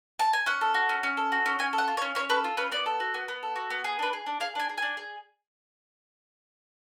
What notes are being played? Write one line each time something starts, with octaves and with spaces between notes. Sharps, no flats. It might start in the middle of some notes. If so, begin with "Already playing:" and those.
A5
G#5
C#4 F#5
A4
F#4
C#4
C#4
A4
F#4
C#4
C#4 G#5
A4
F#5
F4
C#5
C#4
C#4 C#5
A4 B4
F4
C#4 B4
B3 D5
A4
F#4
B3
B3
A4
F#4
B3
G#4
D4 B4
G#4
D4
G#4 F5
D4 G#5
G#4
D4 G#5
G#4